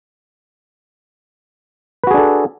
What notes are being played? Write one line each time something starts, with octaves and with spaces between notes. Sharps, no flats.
D4 F#4 G#4 A4 B4